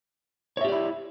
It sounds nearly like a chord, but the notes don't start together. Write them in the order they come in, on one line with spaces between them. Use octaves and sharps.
C#5 E5 G4 D5 E4